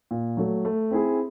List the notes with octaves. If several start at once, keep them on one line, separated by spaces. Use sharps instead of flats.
A#2
F#3 A3
A3
C4 E4 G#4